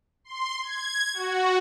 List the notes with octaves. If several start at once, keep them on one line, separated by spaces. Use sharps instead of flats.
C6
G#6
F#4